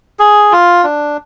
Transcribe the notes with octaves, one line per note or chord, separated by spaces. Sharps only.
G#4
F4
D4